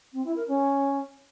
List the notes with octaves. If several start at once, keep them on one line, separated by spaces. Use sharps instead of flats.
C4
E4
A#4
C#4